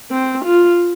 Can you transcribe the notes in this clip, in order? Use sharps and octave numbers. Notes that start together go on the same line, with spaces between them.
C4
F4